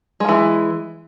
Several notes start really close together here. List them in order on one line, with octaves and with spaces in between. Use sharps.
G#3 F3 E3